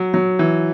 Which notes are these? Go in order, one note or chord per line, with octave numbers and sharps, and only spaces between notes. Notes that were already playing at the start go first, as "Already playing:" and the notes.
Already playing: F#3
F#3
E3